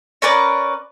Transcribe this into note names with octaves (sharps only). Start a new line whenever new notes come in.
C#4 A#4 B4 D5